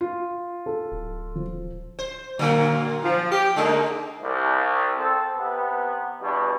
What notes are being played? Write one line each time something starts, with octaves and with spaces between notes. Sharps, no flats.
F4
A4
D1
F3
C5
A#2 D3 F#3 A#3
F3
G4
D3 G#3 A#3 D#4
C2
C4 A4
C3 B3
E2 G2 B2